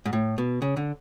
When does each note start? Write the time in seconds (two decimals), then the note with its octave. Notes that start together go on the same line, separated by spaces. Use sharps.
0.05 G#2
0.13 A2
0.38 B2
0.62 C#3
0.77 D3